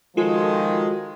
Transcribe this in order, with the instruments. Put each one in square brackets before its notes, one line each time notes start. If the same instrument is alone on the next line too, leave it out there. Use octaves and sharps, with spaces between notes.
[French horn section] D#3 F3 [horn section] G#3 [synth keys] F4 F#4 A4